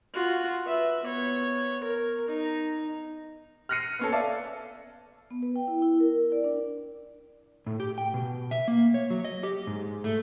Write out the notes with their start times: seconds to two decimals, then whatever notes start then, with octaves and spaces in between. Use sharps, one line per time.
0.14 F4 F#4
0.65 B4 E5
1.04 B3 C#5
1.84 A#4
2.28 D#4
3.69 F6 F#6 A#6 C7 C#7 D#7
3.99 B3 C#4 A4
4.12 A4 D5 E5 F5 A5
5.31 B3
5.42 B4
5.56 G5
5.67 E4
5.82 E4
6.00 A#4
6.32 D5
6.44 D4
7.67 A2
7.80 G4
7.98 G5
8.14 B2
8.51 E5
8.68 A#3
8.94 C#5
9.10 F#3
9.25 D#5
9.43 G4
9.67 G#2
10.04 A3